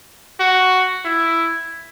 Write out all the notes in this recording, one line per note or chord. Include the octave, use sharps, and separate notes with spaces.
F#4
E4